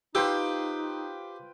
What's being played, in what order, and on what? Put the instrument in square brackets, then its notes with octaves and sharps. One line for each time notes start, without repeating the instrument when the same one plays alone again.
[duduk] D#4 [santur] F4 C5 [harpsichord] G4 [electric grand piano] B4 G5 E6